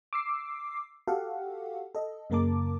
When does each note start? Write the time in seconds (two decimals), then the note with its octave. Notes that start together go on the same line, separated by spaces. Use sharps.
0.13 D6 E6 C7
1.08 F#4 G4 A4 F5 F#5
1.95 A4 D#5
2.30 F#2 C#3 A#3 A#4 A5 D6